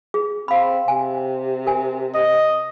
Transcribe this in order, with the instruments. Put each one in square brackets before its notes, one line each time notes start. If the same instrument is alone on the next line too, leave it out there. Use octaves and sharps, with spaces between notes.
[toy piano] G#4
[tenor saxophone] C4 [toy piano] F5 B5
[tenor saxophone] C3 [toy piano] G#5
[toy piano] A#4 G#5
[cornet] D#5